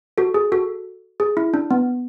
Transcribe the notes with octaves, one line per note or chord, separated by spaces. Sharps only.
F#4 A4
G#4
F#4 A4
G#4
E4
D4
B3